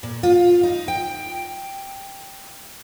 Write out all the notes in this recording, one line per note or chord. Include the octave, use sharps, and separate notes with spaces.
A#2
F4
D#4
G5